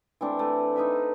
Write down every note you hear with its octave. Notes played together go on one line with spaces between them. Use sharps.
E3 A3 C4 D4
A3
D#4 B4 E5